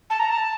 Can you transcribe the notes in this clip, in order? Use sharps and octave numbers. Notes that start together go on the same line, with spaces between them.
A5
A#5
A5